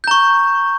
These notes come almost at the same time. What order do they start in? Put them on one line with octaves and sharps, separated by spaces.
G6 A#5 C#6